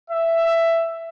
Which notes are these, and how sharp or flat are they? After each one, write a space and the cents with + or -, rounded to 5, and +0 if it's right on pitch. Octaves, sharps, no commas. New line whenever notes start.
E5 +10